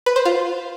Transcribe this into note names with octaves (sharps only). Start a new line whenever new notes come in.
B4
C5
F4